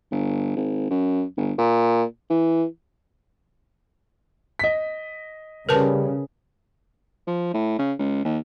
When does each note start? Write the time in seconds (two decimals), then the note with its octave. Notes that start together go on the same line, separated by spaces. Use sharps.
0.11 G1
0.56 G#1
0.90 F#2
1.37 G1
1.58 A#2
2.30 E3
4.59 D#5 B6
5.69 C#3 G3 A#4 B4 A5
7.27 F3
7.54 A2
7.78 C#3
7.99 C#2
8.24 D#2